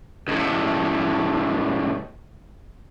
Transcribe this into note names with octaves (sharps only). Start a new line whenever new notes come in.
C#2 A2